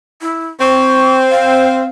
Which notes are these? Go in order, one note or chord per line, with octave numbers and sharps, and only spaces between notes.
E4
C4 C#6
F5